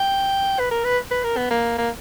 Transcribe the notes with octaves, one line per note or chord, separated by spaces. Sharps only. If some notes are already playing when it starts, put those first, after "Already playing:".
Already playing: G5
B4
A#4
B4
B4
A#4
B3
A#3
A#3